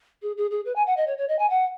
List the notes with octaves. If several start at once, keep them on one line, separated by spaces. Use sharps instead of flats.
G#4
G#4
G#4
B4
G#5
F#5
D#5
C#5
C#5
D#5
G#5
F#5